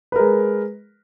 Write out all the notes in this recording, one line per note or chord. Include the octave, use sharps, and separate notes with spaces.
G#3 A#4 B4